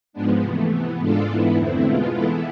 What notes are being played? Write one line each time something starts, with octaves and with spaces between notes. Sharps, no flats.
G#2 F3 G#3 B3 D4
C3 E3 A3
C3 E3 B3
G#2 G#3 D4 F4 A4
G#2 E3 B3 E4
F2 D3 A3 C4 E4
B2 G#3 B3 F4
E3 B3 E4 A4